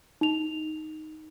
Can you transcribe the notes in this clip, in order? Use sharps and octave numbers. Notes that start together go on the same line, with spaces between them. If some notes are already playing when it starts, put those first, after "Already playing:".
D#4 F7